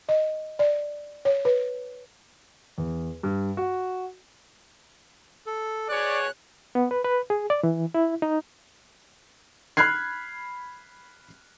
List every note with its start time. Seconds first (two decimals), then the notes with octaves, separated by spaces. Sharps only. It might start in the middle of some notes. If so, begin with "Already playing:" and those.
0.09 D#5
0.59 D5
1.25 C#5
1.45 B4
2.78 E2
3.23 G2
3.57 F#4
5.46 A4
5.89 B2 G#4 C#5 D5 F#6
6.75 B3
6.91 B4
7.04 B4
7.30 G#4
7.50 D5
7.63 E3
7.94 E4
8.22 D#4
9.77 B5 F6 F#6 G#6 C7